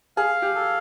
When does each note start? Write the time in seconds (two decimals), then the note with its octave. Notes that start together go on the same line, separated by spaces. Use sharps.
0.17 G#4 F5
0.42 G4
0.55 A4